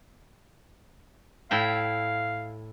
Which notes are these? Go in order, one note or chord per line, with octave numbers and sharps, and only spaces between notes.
A2 E4 F5 G5